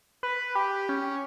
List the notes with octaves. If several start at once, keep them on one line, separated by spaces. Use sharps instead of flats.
B4
G4
C#4